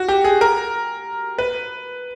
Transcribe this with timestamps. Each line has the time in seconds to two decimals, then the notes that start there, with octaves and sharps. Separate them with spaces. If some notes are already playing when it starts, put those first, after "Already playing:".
Already playing: F#4
0.08 G4
0.24 G#4
0.41 A#4
1.38 B4